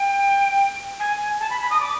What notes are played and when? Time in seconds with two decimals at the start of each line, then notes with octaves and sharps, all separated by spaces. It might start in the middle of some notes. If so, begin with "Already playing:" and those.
Already playing: G5
1.00 G#5
1.41 A5
1.50 B5
1.61 B5
1.71 D#6
1.81 D6